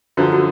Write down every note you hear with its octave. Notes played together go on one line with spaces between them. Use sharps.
F#2 D3 F3 F#4
F#4